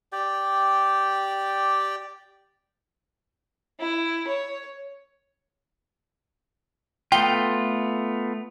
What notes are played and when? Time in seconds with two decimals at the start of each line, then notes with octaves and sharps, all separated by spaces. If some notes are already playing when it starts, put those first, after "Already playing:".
0.12 G4 D5 G5
3.79 E4
4.27 C#5
7.12 A3 B3 F4 G5